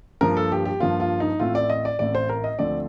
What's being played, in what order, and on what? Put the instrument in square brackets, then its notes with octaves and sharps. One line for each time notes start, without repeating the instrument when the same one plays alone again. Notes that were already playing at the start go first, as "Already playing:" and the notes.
[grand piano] G2 F3 A#3 A#4
A4
G4
G4
G2 F3 A#3 F4
F4
D#4
A1 A2 A3 C4 F4
D5
D#5
D5
A1 A2 A3 C4 D5
C5
A#4
D#5
D2 D3 F3 A3 C4 D5